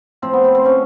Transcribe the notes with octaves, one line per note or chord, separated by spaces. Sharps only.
A2 F3 C4
B3
C4
C4
A2 F3 C#4